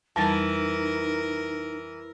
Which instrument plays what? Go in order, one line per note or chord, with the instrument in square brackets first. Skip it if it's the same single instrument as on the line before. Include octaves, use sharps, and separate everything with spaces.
[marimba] F2 G3 A6 [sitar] E3 [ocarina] D#4 [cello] A#4